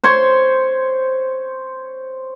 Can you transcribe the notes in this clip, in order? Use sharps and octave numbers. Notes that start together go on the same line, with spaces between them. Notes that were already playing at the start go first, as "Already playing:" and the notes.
C5 C#5 C6